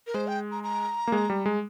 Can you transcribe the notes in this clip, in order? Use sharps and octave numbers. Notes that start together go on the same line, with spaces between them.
A#4
G#3 C5
G5
A#5
A#5
A#3
G#3
G3
G#3